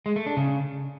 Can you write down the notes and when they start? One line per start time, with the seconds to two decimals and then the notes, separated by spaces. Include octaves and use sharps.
0.06 G#3
0.16 A3
0.26 D4
0.37 C#3